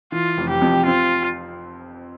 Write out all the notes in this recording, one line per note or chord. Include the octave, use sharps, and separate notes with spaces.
E3 F4
F1
G4
F2
C4 F4